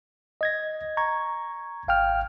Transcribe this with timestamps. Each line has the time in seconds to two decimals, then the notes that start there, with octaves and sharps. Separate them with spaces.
0.41 D#5 G#6 A#6
0.97 A#5 C#6 G#6
1.88 G#1 F5 G5 F6